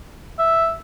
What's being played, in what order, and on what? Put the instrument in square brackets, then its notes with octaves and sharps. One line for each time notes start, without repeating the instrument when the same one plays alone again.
[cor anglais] E5